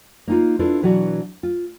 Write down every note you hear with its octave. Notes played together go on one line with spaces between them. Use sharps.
A#3 D#4 F4
D4 E4 F4 A4 B4
B2 E3 F#3 D4 F#4 B4
F4